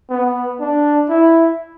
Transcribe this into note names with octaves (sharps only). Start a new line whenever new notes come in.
B3
D4
E4